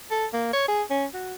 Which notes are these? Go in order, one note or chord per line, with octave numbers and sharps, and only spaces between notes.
A4
A#3
C#5
G#4
C#4
F#4